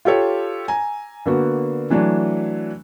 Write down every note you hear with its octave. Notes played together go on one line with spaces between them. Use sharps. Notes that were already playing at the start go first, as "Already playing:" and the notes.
F4 G4 A4 C#5
G#5 A#5
D3 A#3 B3 F#4
E3 F#3 A3 D4